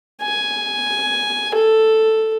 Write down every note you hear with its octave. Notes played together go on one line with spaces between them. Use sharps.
G#5
A4